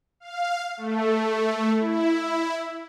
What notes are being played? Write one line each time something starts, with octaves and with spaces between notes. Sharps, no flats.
F5
A3
E4